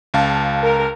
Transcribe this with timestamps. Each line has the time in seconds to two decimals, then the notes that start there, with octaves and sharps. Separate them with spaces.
0.14 C#2 F5 A5
0.62 A#4